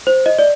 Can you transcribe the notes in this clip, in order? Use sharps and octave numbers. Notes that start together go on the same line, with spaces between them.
C5
D#5
D5